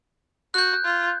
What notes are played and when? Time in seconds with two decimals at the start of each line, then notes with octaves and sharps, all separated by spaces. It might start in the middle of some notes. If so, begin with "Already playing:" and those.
0.54 F#4 F#6 G6
0.84 F4